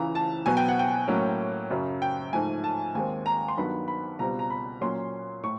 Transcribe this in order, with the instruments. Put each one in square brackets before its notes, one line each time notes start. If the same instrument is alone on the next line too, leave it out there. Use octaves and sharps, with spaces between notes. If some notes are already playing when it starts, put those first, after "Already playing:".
Already playing: [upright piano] C#2 C#3 E3 A#5
A5
B2 F#3 B3 G#5
G5
F#5
G5
A2 F#3 A#3 C#4
F#2 C#3 F#3
G5
G#2 F3 A3 G#5
A5
D#2 D#3 G#3 C4 G#5
A#5
C6
G2 D#3 F#3 B3 B5
B5
C#2 B2 G3 C4 A#5
A#5
B5
A#2 F#3 A#3 C#4 C6
A2 C#6